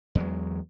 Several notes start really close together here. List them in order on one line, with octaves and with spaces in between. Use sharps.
E2 G#3 F#3